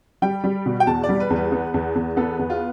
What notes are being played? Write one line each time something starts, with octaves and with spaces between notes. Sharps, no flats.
G3 G5
G3
B2
G5
E2 A5
D5
G3
B4
E2
B4
B3
E2
E2
B3 A4
E2
F4